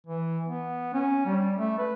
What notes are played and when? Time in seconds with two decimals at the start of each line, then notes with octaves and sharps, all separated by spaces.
0.06 E3
0.48 B3
0.94 C#4
1.26 G3
1.57 A3
1.78 B4